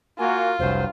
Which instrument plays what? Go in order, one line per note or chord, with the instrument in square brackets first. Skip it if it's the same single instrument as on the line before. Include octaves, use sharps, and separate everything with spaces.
[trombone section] A#3 F#4 [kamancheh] F4 [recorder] G#5
[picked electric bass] F1 C2 [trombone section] G2 F#3 [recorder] C5